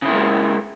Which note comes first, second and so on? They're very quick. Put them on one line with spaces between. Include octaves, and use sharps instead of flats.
C#3 E4 A#3 G#3